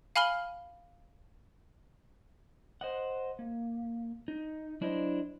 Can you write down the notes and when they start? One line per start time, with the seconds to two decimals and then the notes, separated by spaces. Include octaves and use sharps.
0.16 F5 G#5 B5 F6 F#7 G7
2.81 C5 D#5 F#5
3.39 A#3
4.28 D#4
4.81 F#3 D4 E4 C5 D#5